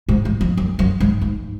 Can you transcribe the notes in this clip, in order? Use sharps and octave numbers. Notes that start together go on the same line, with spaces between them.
G#2
G#2
F2
F#2
F#2
G#2
G#2